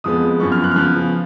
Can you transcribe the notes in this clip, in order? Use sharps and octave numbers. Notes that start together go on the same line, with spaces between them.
F2 F3 G#3 B3 D#6
F#2 F3 B3 C#6
F6
F#6
F6
C#3 F3 B3 F#6